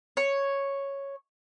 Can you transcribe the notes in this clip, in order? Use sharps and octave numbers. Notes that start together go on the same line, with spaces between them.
C#5